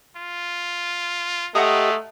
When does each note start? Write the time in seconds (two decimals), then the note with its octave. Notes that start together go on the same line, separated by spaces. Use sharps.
0.16 F4
1.55 G#3 A3 G4 D#5 F#5 A#5 D#6